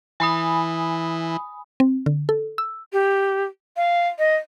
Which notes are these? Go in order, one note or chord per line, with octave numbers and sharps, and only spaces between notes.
E3 G#5 B5 D#6
C4
D3
A4
E6
G4
F5
D#5